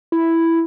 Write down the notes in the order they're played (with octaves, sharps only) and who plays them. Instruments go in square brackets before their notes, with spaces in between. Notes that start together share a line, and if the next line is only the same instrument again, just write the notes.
[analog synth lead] E4